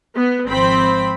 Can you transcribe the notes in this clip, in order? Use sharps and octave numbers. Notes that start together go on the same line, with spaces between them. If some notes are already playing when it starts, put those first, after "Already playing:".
B3
G#1 F3 C4 B5